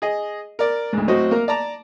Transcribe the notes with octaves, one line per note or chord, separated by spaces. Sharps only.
G#4 D#5
A#4 D5
D2 G#2
A2 F#3 C4 F#4 D#5
A#3 A#4
D5 A5 A#5